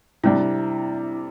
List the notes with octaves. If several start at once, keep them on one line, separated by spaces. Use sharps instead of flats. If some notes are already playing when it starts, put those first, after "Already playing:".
C3 G3 D4 E4